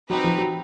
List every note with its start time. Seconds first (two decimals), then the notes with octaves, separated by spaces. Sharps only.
0.10 F#3 C4 D#4 G4 B4
0.24 F3
0.38 F#3